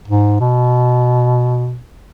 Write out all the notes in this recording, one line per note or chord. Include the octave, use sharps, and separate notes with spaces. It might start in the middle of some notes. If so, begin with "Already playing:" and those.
G#2
B2